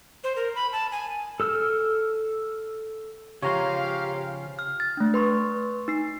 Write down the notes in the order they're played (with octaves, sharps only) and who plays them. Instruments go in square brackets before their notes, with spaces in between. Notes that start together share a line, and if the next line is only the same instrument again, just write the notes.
[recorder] C5
A#4
B5
A5
G#5
[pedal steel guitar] A4 E6 F6
[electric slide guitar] C#3 F3 [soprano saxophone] G4 [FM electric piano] C#5 A#5 C6 [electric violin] F5
[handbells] F6
F6 A6
A3 D4
B4 C6 C#6
D#4 C7